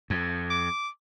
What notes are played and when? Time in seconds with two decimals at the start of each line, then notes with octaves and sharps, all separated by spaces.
0.10 F2
0.50 D6